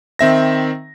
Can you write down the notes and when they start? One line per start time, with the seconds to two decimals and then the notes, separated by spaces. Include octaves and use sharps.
0.19 D#3 C4 E5 A#6